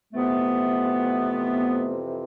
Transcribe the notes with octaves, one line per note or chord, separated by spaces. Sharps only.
F2 C3 E3 A3 B3